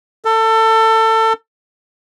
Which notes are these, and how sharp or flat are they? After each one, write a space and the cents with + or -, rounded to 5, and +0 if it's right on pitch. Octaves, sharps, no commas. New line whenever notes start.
A4 +25